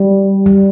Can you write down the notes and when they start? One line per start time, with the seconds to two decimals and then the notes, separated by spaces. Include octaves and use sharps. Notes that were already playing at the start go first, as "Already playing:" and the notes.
Already playing: G3
0.46 G3